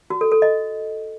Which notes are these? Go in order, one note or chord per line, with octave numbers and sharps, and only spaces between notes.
F#4
A4
A4
D#5